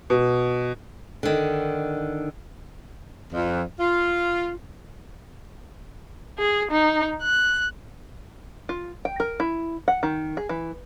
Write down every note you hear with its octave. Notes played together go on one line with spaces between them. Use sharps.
B2
D3 D#3
F2
F4
G#4
D#4
F#6
F4
G5
A#4
E4
F#5
D#3
G#4
E3